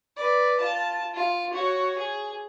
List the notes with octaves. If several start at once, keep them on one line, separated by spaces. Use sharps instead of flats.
B4 D5
F4 A5
F4
F#4 C#5
G#4